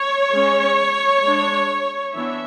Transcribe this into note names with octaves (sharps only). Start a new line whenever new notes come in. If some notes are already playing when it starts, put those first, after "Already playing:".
Already playing: C#5
G#3 C#4
G#3 D4
E3 B3 D4 E5